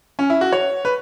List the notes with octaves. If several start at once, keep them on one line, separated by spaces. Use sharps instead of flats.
C#4
E4
F#4
C#5
B4